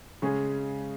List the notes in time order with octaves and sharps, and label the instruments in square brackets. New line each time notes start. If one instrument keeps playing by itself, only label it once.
[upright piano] C#3 G#3 C#4 G#4